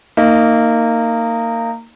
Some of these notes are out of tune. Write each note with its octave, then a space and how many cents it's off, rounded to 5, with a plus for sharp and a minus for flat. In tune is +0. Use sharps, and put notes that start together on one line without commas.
A#3 -20 D#4 +0